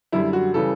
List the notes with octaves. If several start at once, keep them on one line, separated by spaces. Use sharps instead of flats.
F#2 D3 G3 E4
F#4
C#3 E3 G3 A4